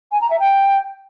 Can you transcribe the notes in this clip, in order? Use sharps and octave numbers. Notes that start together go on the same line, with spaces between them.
G#5
A#5
E5
G5